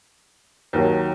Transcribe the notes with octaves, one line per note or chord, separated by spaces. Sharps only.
D#2 D#3 F#3